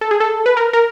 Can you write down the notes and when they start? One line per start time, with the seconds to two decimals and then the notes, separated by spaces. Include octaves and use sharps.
0.01 A4
0.11 G#4
0.20 A4
0.46 B4
0.57 A#4
0.73 A#4